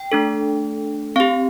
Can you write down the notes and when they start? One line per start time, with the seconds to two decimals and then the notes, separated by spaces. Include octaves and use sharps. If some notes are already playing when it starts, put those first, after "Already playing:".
Already playing: G5
0.12 A3 D4 A4
1.16 C4 G4 F5